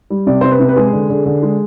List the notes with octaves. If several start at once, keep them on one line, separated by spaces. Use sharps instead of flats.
G3
C3 D5
C3 C5
B4
C3
B4
G#3 G#4
D3
D3
D3
G#3